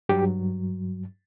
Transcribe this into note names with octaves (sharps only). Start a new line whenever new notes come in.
G2 F#3 G4